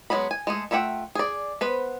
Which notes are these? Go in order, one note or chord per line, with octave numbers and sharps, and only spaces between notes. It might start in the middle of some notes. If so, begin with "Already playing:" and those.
F#3 G#3 B3 B5
G#5
G#3 A3 G#4
A3 F4 E5 F#5 G5
G#4 D5
B3 B4 C5